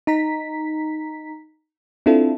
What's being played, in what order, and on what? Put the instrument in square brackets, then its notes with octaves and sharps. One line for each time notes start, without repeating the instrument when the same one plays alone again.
[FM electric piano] D#4 A#5 B6
C4 D4 E4 F4 A4